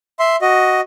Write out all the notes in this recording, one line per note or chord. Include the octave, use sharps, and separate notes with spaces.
E5 C6
F#4 D#5